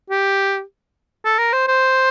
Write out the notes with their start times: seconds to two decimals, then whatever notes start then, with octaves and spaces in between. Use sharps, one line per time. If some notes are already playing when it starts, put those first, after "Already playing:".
0.10 G4
1.25 A4
1.39 A#4
1.53 C5
1.68 C5